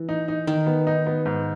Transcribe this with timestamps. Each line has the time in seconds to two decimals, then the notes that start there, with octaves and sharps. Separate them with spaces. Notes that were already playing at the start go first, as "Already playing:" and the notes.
Already playing: E3
0.09 D#4
0.28 D#4
0.47 D#3 D#4
0.67 B3
0.87 D#4
1.07 B3
1.26 G#2